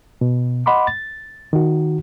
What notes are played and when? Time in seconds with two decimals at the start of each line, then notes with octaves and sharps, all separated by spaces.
0.21 B2
0.66 D#5 F#5 B5 C6 D6
0.87 A6
1.53 D#3 F#4